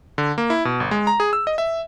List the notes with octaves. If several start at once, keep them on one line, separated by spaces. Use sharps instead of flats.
D3
A#3
E4
B2
G1
G#3
A#5
G#4
E6
D#5
E5